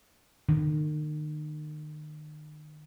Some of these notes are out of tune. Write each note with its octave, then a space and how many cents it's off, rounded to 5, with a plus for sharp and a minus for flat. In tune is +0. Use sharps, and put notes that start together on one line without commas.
D#3 -40